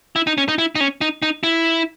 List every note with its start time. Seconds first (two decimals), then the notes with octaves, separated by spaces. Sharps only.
0.16 E4
0.27 D#4
0.38 C#4
0.49 D#4
0.58 E4
0.75 D#4
0.80 C#4
1.01 D#4
1.22 D#4
1.43 E4